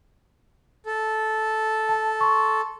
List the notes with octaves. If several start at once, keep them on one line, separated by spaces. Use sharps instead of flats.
A4
A5
C6 C#6